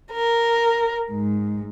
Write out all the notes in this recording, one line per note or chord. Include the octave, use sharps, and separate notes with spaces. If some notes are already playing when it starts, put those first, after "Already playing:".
A#4
G#2